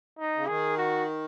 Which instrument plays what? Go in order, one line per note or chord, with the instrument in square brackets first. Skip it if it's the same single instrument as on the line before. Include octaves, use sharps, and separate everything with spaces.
[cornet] D#4
[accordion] C#3
[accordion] D#3 [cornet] G#4
[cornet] F#4